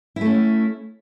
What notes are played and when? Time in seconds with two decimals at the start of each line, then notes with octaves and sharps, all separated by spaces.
0.16 E4
0.21 A3
0.26 C#4